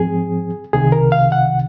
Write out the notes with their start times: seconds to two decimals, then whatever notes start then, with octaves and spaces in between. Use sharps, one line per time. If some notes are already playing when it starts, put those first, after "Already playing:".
Already playing: G#2 F3 C4 G#4
0.73 C2 C3 D#3 G#4
0.92 A#4
1.12 F5
1.32 F#5